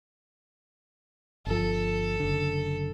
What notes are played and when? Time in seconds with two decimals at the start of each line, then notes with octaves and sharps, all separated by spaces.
1.46 G1 F3 A4
2.20 F#1 D3